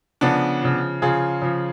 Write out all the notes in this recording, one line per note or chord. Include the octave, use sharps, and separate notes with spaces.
C#3 F3 B3 D4
C#3 F3
C#3 F3 F4 G#4
C#3 F3